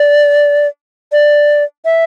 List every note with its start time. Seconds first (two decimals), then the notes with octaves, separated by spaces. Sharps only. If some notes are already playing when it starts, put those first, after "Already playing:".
Already playing: D5
1.12 D5
1.85 E5